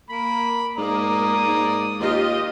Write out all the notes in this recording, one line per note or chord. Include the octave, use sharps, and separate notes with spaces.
A#3 B5
G#2 A#3 D5 A#5 D#6
G#2
D#2 F4 G4 D#5